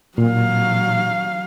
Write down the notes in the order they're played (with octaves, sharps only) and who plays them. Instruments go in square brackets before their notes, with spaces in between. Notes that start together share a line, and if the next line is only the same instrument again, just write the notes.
[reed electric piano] A#2 [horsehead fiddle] F#3 F5